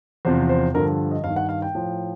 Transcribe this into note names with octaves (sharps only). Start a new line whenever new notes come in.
E2 C3 F3 C5
C5
G2 D3 F3 A#4
D#5
G2 D#3 F5
F#5
F5
G5
A2 F3